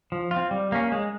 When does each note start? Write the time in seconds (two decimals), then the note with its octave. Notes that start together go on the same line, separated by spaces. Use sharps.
0.12 F3
0.31 F4
0.36 C4
0.51 G3
0.72 A#3 C#4
0.92 G#3